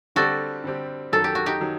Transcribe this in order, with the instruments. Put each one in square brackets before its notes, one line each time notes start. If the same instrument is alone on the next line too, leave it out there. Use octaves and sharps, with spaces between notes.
[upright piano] D3 G3 C4 G4 D5 [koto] F#4 A4
[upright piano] D3 G3 C4 G4 D5
[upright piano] F#2 D#3 F#3 [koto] A4
[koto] G4
F#4
D#4 G4
[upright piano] D#3 F#3